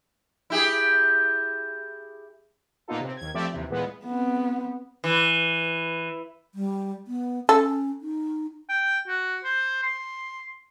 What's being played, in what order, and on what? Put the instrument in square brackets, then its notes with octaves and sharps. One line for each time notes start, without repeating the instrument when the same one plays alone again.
[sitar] E4 G4 G#4
[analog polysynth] A#2 A#3 B3 D#4 F4 A4
C3 C4
D#2 G#6
F3 A3 C4 G4 D5 E5
D#2 C3 E3
A#2 E3 G#3 B3
[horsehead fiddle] B3 C4
[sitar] E3
[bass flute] G3
B3
[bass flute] C#4 [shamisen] A4
[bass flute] D#4
[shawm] G5
F#4
C5
C6